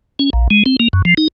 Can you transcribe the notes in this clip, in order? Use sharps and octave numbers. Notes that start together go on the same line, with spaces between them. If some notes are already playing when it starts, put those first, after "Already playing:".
C#4
A#1
G#3
C4
A#3
F#2
F3
D#4